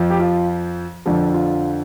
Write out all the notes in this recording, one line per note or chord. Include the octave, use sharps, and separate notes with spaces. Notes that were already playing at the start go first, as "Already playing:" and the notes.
Already playing: F2 F3
G4
F4
F2 D3 F3
F4